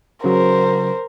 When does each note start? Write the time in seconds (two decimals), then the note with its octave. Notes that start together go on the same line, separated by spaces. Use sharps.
0.24 C#3 F#3 A#4 C5